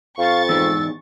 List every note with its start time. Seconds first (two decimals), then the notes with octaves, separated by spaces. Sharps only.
0.18 F2 F5 C#6 A6
0.49 E2 G#2 G#3 E6